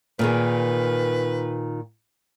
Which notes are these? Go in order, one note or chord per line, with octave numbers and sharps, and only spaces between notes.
A#2 D#3 G#4 B4